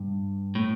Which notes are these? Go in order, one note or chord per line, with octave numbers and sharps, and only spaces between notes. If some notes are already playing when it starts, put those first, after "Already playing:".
Already playing: G2
A2